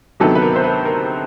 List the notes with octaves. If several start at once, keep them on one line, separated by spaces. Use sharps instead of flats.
D2 C3 D#3 F#3 B3 A4
B4
A#4
C5
B4
A#4